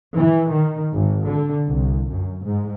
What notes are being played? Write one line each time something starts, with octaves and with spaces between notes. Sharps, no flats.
E3
D#3
G#1
D3
C2
F#2
G#2